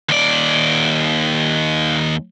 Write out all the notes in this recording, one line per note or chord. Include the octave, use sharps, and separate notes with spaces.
D#2 D5